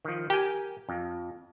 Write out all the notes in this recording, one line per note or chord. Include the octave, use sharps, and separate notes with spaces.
D#3 F3
G4 A#4 G#5 G6
F2